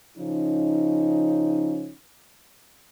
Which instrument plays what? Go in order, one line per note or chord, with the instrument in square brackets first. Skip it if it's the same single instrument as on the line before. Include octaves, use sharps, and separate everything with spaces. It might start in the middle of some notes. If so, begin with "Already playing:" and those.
[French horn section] C#3 F3 C#4 D#4